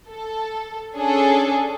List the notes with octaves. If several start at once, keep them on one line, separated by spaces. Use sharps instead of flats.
A4
C#4 D4 G#4 A4